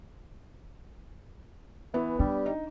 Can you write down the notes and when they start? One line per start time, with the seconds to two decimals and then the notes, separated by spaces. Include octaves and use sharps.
1.94 E3 B3
2.19 G3 D4
2.46 D#4